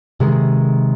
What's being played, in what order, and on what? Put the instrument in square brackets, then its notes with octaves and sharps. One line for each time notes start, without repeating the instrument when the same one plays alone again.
[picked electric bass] C3 D#3 G#3